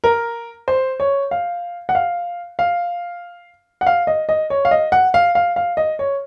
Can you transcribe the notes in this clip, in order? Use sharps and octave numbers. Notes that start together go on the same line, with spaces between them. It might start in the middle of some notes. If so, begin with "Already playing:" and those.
A#4
C5
C#5
F5
F#5
F5
F5
F#5
F5
D#5
D#5
C#5
F5
D#5
F#5
F5
F5
F5
D#5
C#5